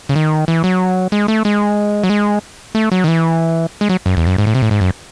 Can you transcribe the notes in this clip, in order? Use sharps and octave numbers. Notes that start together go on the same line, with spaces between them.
C#3
D#3
E3
F#3
G#3
A3
G#3
F#3
G#3
A3
F#3
D#3
E3
G#3
F#3
F#2
E2
F#2
G#2
A2
C3
A2
G#2
F#2